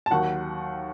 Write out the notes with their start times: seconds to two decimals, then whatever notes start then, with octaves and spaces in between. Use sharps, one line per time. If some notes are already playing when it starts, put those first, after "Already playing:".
0.06 A5
0.10 D#2 D#3 F#3 F#5